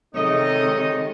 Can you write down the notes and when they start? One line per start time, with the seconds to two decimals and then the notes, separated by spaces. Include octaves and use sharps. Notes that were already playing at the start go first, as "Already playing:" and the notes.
0.14 C3 D#3 G#3 D#4 A4 C#5 D#5